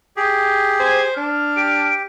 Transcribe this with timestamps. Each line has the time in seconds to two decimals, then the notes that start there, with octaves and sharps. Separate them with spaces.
0.17 G4 G#4
0.80 C5 G#5
1.17 D4 F6
1.56 G4 D7